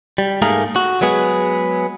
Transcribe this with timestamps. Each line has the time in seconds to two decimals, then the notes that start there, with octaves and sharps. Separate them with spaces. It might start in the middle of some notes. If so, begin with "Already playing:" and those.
0.18 G3
0.42 G#2 A3 A#3 G#4 A#4
0.76 F#4
1.01 F#3 G#3 B3 G#4